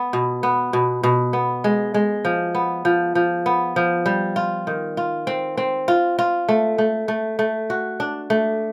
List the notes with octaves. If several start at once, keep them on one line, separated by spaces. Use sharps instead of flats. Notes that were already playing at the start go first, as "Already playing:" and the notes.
Already playing: B3
B2
B3
B2
B2
B3
G#3
G#3
F3
B3
F3
F3
B3
F3
G3
F4
D#3
F4
C4
C4
F4
F4
A3
A3
A3
A3
F#4
D4
A3